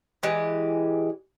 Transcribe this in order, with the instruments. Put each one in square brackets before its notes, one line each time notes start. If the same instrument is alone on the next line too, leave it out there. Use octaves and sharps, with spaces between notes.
[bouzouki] E3 G#3 G4